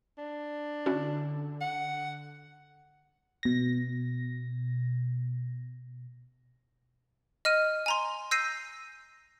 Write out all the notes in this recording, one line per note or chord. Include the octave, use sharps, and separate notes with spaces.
D4
D3 C#4 E4 F#4
F#5
B2 A#6
D#5 F6 D#7
G#5 A#5 C6
E6 G6 A#6 C7 D#7